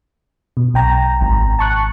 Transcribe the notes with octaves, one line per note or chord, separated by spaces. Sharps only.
B2
B1 G5 A#5
G#1
A5 C#6 F#6